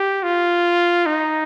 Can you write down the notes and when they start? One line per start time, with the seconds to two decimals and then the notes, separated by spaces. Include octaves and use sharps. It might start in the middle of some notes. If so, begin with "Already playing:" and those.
Already playing: G4
0.23 F4
1.06 D#4